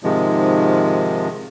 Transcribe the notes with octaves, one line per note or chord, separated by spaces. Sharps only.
G#2 C3 D#3 F3 G#3